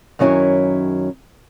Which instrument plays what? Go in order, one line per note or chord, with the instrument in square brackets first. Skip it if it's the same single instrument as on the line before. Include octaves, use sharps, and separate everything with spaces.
[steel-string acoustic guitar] F#2 D#3 F#3 C#4 E4